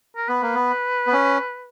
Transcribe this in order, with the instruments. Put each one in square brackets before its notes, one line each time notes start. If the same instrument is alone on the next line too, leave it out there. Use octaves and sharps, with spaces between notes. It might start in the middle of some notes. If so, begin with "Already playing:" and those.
[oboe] A#4
[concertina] B3 [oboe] B4
[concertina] A#3
B3
B3
C#4